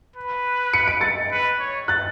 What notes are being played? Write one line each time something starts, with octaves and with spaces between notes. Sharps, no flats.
B4
C#7
D7
A6 C#7
B4
C#5
F#6 A6